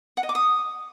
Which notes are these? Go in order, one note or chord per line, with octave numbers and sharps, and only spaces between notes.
F#5
D#5
D6
D#6